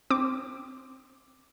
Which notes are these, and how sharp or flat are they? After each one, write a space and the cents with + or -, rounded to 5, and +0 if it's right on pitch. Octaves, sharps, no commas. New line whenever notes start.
C4 +0 D6 +0